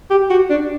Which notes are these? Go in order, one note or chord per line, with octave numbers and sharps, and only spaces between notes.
G4
F#4
D4